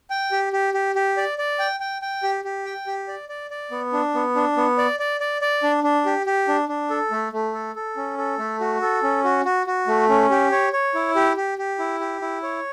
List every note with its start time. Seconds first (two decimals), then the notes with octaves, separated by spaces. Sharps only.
0.10 G5
0.32 G4
0.53 G4
0.74 G4
0.95 G4
1.17 D5
1.38 D5
1.59 G5
1.80 G5
2.02 G5
2.23 G4
2.44 G4
2.65 G5
2.87 G4
3.08 D5
3.29 D5
3.50 D5
3.71 B3
3.93 D4
4.14 B3
4.36 D4
4.57 B3
4.78 D5
4.99 D5
5.20 D5
5.41 D5
5.63 D4
5.84 D4
6.06 G4
6.26 G4
6.48 D4
6.69 D4
6.90 A4
7.11 A3
7.33 A3
7.54 A4
7.76 A4
7.97 C#4
8.18 A4
8.39 A3
8.61 F#4
8.82 A4
9.03 C#4
9.24 F#4
9.45 F#4
9.67 F#4
9.87 A3
10.09 C#4
10.30 G4
10.52 C#5
10.73 C#5
10.95 E4
11.15 G4
11.37 G4
11.58 G4
11.79 E4
12.00 G4
12.22 E4
12.43 C#5